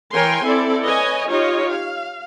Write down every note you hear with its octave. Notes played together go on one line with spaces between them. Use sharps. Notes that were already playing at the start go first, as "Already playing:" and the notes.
E3 A#4 C#5 G5 G#5 C6
C4 E4 A4 D5
B4 C#5 D#5 G#5
D#4 F4 G4 C#5 D#5
F5